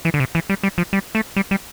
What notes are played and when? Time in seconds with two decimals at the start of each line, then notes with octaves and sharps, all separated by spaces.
0.05 E3
0.14 D3
0.20 C3
0.35 E3
0.50 G3
0.63 G3
0.78 F3
0.93 G3
1.15 A3
1.36 G3
1.51 G3